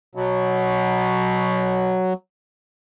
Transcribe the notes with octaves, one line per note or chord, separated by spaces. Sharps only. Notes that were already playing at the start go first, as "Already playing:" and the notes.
B2 F#3